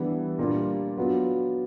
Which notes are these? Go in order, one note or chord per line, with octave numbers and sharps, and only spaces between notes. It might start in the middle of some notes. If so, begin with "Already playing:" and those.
Already playing: E3 G3 B3 D4
A#2 G3 A#3 D4 F4
F#3 B3 D4 F4